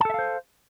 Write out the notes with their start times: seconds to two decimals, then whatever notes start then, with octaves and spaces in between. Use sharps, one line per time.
0.01 A5
0.05 A4
0.10 E5
0.14 F5
0.19 C5